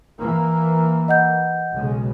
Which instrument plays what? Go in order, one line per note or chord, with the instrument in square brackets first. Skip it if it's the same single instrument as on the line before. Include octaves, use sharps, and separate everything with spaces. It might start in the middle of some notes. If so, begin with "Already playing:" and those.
[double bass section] E3 A#3
[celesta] D#5 F#5 G6
[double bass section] B1 C#3 G#3